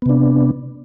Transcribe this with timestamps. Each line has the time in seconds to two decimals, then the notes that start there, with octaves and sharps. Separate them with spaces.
0.02 B3
0.06 C3
0.09 D4